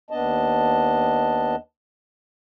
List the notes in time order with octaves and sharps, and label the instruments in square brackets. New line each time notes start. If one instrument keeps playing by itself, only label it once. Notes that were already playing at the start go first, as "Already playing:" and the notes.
[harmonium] D#2 B3 D4 D#5 A5